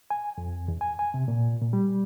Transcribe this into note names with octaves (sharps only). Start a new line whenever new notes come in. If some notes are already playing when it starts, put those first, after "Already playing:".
G#5
F2
E2
G#5
G#5
C3
A#2
A#2
G3